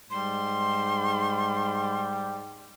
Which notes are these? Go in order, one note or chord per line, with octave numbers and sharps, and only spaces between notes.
G#2 G3 C6